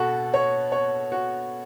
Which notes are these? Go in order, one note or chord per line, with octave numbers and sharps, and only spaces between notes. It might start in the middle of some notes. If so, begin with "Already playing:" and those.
Already playing: B2 F#4 A4
C#5
C#5
F#4